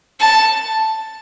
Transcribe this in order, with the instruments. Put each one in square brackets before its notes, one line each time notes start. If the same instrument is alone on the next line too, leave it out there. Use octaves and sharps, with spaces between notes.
[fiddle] A5